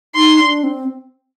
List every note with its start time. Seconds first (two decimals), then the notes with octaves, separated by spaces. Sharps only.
0.15 D#4 C6
0.39 D4
0.64 C4